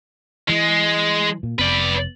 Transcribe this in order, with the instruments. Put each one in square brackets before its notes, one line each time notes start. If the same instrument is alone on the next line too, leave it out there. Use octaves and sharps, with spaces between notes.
[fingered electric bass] E3 [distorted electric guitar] G#3
[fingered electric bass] A#2
[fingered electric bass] F1 B3 [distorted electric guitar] B4 D5